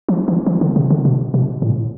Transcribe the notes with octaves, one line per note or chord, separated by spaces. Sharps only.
F3
E3
E3
D3
C3
D3
B2
B2
A2